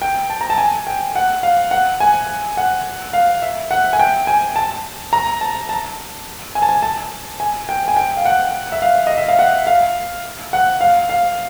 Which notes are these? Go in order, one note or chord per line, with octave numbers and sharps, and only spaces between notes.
G5
A5
A#5
A5
G#5
G5
F#5
F5
F#5
G#5
F#5
F5
E5
F#5
G#5
G5
G#5
A5
A#5
A5
A5
G#5
A5
G#5
A5
G#5
G5
G#5
G5
F5
F#5
E5
F5
D#5
E5
F5
F#5
F5
F#5
F5
F5